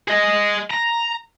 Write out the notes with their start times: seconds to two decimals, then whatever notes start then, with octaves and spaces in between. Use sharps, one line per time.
0.08 G#4 D#5
0.71 A#5